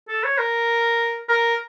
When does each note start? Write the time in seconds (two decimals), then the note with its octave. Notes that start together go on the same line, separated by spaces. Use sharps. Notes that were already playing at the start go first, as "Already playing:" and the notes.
0.09 A4
0.24 C#5
0.38 A#4
1.29 A#4